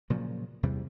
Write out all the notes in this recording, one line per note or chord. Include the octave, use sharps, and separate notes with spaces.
A#2 C#3 F3 F#3
E2 C3 E3 G3